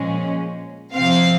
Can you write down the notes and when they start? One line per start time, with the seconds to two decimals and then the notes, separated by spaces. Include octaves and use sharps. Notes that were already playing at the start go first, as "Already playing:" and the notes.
Already playing: A#2 F3 G#3 C#4
0.94 C3 F3 C4 F5